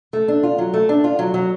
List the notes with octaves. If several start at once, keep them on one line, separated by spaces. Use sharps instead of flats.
A3
D4
F4
F#3
A3
D4
F4
F#3
F#3